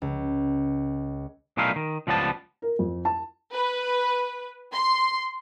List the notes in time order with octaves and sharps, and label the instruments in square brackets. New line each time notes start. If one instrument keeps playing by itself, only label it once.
[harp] C#2
[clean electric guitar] B1 A#2 A3 D#4 E4 F5
D#3
C#2 F3 G3 B3 A5
[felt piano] A#4
F2
A5
[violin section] B4
C6